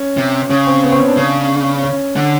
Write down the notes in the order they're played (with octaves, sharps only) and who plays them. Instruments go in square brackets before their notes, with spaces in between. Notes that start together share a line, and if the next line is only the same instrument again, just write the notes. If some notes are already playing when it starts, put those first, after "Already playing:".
Already playing: [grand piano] C#4
[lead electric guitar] C3
[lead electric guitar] C#3 [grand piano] C#4
[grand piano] C4
B3
C4
C#4
D4
[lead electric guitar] C#3
[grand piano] C#4
[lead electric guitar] D3 [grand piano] C#4